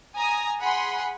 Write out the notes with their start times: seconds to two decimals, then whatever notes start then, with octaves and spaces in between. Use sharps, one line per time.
0.15 G#5 A#5 D#6
0.60 G#4 F#5 G#5 B5 C6